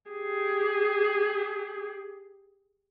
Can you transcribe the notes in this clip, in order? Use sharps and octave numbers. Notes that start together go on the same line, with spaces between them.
G4 G#4